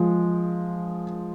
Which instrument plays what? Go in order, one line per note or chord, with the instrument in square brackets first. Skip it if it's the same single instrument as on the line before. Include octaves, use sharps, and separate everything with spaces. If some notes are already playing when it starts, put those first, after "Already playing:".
Already playing: [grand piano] F3 G#3